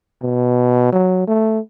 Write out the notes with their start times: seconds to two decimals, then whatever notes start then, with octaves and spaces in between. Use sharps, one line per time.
0.22 B2
0.93 F#3
1.28 A3